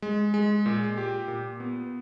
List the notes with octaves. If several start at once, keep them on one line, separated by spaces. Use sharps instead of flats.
G#3
G#3
A#2
G4
A#2
B3